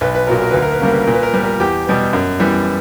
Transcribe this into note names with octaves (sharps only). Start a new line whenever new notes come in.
B1 B4
B4
A#2 F#3 B3 A#4
A#4
D2 B4
A#4
B4
C#3 G3 A#3 A#4
B4
A#2 A#4
B4
A#4
G3 B3 B4
A#4
E2 G4
B2 G3 B3
F#2
E3 G3 B3